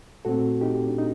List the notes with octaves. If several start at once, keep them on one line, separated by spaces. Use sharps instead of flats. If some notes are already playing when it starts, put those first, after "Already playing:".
A#2 A3 C4 F#4 A4
D#4 G4
D4
D#4